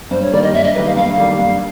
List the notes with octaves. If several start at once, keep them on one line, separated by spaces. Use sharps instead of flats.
G2 C5
C#5
D#3 G3 A#3 D5
D#5
G2 E5
D#5
D#3 G3 A#3 B4
F5
G2 F5
D#3 G3 A#3
G2